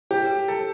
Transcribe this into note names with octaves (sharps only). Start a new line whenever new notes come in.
G4
A4